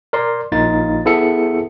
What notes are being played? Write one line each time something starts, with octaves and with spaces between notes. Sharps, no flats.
A#4 D5 C6
A#1 A#3 D#4 F4 A6
B3 E4 G#4 A4 E5 C#7